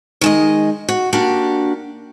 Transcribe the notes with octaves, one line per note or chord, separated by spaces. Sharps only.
D#3 G#3 D#5
F#4
A#3 D4 F#4 G4